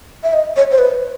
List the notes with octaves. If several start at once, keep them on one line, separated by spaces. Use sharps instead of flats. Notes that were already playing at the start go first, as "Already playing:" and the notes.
E5
D#5
C#5
C5
B4